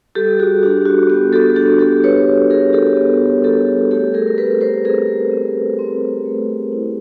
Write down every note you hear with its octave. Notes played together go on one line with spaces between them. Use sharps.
G3 G4 A4
F#4 G#4
D4 G4
F#4
B3 G4
G4 A4
D4 G4 A4
G4 A4
F#4 B4 C#5
D4 G#4 A#4
G4 A4
B3
G3 G4 A4
A3 G4 A4
G#4 A#4
A#4
C4 A4 B4
A#4 C5
C4 G#4 A#4
C4
C4
A3
E4